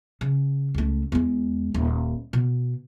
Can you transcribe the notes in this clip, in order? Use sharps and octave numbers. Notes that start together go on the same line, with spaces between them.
C#3
C#2 A3
E2 G#3
D#1
B2